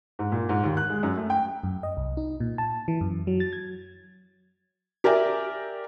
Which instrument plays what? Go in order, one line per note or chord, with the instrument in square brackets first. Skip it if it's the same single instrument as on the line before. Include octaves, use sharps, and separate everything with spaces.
[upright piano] G#2
A#2
G#2
D#2
F#6
G#3
F#2
A3
G5
[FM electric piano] F#2
D#5
C2
D#4
A#2
A5
E3
F#2
F#3
A6
G#6
[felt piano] G4 A#4 D5 E5 G#5